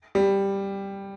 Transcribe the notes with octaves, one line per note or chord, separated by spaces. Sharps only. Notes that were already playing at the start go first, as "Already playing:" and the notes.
G3